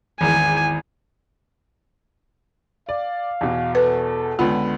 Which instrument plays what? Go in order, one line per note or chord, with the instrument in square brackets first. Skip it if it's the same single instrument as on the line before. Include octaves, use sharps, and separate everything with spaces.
[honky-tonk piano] G#1 E2 [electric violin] G#5
[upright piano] D5 [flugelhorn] F5
[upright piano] E2 B2
[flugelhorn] A4 [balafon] B4
[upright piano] C#2 D3 B3 [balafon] F4